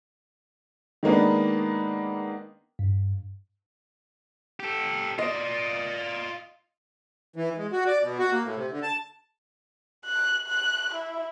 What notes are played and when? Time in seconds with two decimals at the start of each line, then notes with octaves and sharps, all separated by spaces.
1.03 D#3 G#3 A#3 B3 D4
2.79 G2
4.60 G4 A4
5.19 F4 D5 D#5
7.36 E3
7.58 G#3
7.72 F#4
7.87 D5
8.02 B2
8.19 F#4
8.31 A#3
8.44 A2
8.56 C3
8.71 D3
8.83 A5
10.05 F#6
10.47 F#6
10.94 E4